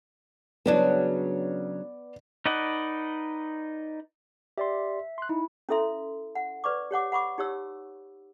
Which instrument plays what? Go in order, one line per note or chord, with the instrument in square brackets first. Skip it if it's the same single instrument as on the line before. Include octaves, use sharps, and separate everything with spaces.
[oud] C#3 F#3 D4 [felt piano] B3 D5
[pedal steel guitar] D#4 B4 D5 D#5 F#5
[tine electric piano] G4 D5 C6 [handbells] E5
[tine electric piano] C6 F#6
[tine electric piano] D#4 [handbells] E4
[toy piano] C#4 E4 A4 E5 C6
F#5
B4 D5 C#6 D6
G4 C#5 F#5 D6
F#5 B5 C#6 D6
D#4 G4 C#5 E6